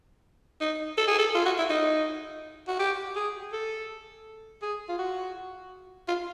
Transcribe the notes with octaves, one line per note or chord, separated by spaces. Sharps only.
D#4
A4
G#4
A4
F4
F#4
E4
D#4
F#4
G4
G#4
A4
G#4
F4
F#4
F4